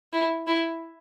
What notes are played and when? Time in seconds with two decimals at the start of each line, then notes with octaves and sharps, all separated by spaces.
0.13 E4
0.47 E4